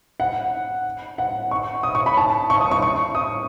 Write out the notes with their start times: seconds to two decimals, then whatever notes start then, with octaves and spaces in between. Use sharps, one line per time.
0.20 F#5
1.18 F#5
1.51 C#6
1.83 D#6
1.95 C#6
2.06 B5
2.17 A5
2.50 C#6
2.61 D#6
2.71 C#6
2.82 C#6
3.15 D#6